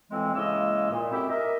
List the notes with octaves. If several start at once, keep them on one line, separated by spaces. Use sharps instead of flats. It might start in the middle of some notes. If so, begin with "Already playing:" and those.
F2 A2 E3 G#3 C4
C#3 E3 G#3 A#3 D#5 E6
A#2
F#2 A2 C4 E4 G4 E5
A#4 D#5 E5